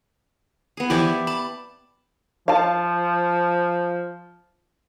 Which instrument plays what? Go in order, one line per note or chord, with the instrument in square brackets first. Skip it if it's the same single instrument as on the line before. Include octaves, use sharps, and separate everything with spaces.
[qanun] B3 G#4
[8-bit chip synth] E3 F3 E4 [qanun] G4 D5 E5
[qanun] A5 [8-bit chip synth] B5
[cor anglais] F3 [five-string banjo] F5 A5